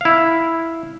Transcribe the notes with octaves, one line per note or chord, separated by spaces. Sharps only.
E4 F5